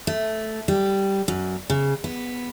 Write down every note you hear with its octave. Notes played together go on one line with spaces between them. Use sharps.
A3
G3
F#2
C#3
B3